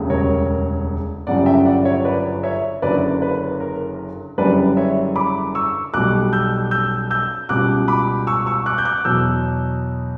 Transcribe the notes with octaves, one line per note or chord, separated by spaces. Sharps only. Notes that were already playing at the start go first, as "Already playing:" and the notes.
Already playing: E1 D2 C#3 G3
A#4 C#5
G1 F#2 C#3 G3 D5 F#5
E5 G5
D5 F#5
C#5 E5
B4 D5
C#5 E5
F#1 F#2 D3 F#3 B4 D5
B4
A#4
F#1 F#2 D3 G3 B4 D5
C#5 E5
B5 D6
C#6 E6
B1 B2 G3 D6 F#6
E6 G6
E6 G6
E6 G6
C#2 B2 G3 D6 F#6
B5 D6
C#6 E6
C#6 E6
D6 F#6
G6
D6 F#6
E2 B2 F#3 E6 G6